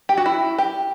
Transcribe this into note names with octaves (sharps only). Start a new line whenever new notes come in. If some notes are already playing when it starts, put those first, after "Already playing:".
G4
F#4
E4
G4